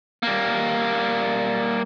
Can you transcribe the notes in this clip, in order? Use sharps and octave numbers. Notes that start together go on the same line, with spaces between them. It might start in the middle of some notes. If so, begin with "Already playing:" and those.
G3 A#3